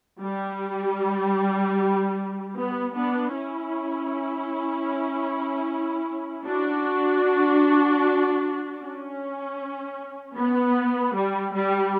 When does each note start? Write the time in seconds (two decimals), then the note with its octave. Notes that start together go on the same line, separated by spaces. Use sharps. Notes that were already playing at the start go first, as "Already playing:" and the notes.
0.21 G3
2.55 B3
2.94 B3 D4
3.33 C#4 E4
6.46 D4 F#4
8.80 C#4
10.37 B3
11.15 G3
11.54 G3